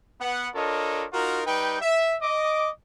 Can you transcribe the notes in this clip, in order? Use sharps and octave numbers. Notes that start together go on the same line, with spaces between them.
B3 F#5
D4 F4 A4 A#4 C#5 D#5
D#4 F4 F#4 A#4
G3 D#4 B4 G5
E5
D#5 D6